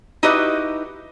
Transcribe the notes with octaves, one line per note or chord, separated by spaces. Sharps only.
D#4 E4 F#4 G4 B4 D#5